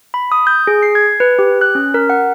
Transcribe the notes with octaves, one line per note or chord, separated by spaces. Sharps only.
B5
D#6
G6
G#4
C7
G#6
B4
G4
F#6
C#4
A#4
F#5